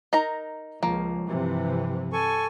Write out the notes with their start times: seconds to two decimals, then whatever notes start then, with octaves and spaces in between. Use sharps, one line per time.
0.13 D#4 A#4 A#5
0.83 C#2 F3 A#3
1.27 G2 C3 E3
2.13 A4 G#5 C#6